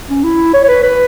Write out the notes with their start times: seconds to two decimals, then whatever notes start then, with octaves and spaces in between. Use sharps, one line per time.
0.09 C#4
0.24 E4
0.54 C#5
0.64 C#5
0.68 B4
0.83 B4